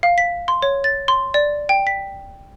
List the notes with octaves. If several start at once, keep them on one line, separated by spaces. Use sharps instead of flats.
F5
B6
C6
C#5
A6
C6
D5
G5
B6